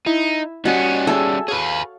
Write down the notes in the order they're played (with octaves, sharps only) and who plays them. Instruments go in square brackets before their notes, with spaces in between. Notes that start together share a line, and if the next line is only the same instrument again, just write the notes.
[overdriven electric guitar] D#4 [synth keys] E4
[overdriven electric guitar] G3 C#4 [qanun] F#4 [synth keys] D#5
[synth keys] G#4 E5 G#5 [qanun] A4
[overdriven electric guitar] G#4 B4 [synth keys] C#5 F5